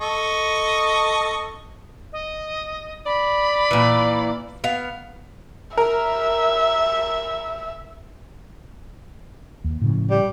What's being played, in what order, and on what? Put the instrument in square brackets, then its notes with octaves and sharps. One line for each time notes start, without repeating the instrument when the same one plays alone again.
[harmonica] A4 D#5 C#6
[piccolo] D#5
[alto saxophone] D5 [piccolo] B5
[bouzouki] A#2 E3
B3 F5
[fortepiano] A#4 [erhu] E5
[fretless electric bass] D#2
A2 C#3 F3
[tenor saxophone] G3